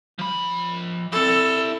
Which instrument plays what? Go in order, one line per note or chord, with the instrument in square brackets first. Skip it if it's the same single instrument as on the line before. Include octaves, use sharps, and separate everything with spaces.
[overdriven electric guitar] F3 B5
[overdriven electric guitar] C4 E4 [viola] A4